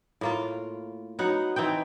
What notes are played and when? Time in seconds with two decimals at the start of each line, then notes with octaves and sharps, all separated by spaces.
0.21 A2 A#3 F4
1.19 F#3 B3 D#4 F#5
1.56 E3 C4 D#4 G5